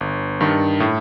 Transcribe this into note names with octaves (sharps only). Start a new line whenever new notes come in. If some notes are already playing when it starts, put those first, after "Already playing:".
G1
G2 D#3
A2